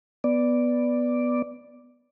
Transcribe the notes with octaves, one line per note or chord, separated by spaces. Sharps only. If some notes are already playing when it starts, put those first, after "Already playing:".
B3 D5